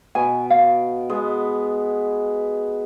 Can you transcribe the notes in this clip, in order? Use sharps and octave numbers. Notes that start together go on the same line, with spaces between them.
B2 G#5
F5
G#3 B3